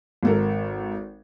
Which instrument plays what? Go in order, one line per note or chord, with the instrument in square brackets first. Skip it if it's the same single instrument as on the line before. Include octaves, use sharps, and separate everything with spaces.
[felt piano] G#1 A4 A#4